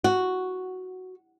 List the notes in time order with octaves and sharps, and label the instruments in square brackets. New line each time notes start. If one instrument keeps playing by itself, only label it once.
[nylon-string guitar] F#4